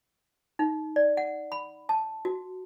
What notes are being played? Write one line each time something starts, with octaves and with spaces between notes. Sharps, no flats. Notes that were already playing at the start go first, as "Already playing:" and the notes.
D#4
D5
F#5
B5
A5
F#4